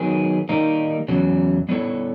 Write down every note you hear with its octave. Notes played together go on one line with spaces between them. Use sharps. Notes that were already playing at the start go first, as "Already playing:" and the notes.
Already playing: D#3 F#3 B3 G#4
D#3 G3 A#3 D#4
E2 C#3 F#3
G3 B3 E4 A4 C#5